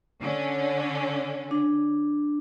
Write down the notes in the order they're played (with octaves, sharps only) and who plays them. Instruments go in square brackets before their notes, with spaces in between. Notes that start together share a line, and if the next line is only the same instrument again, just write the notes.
[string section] D3 C#4
[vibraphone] D4